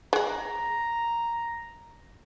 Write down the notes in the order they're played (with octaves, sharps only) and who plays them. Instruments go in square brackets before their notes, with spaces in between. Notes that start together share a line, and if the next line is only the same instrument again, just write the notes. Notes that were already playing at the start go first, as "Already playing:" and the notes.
[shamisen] G#3 G#4 [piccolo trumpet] A#5